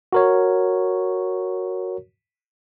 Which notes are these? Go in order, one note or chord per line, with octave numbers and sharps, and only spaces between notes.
F#4 A#4 C#5